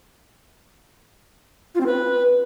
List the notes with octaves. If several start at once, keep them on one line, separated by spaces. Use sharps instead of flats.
F4
C4
B4